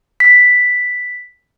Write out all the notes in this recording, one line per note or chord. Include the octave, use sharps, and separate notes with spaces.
B6